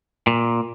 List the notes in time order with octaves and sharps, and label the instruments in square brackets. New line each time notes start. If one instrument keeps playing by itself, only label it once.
[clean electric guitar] A#2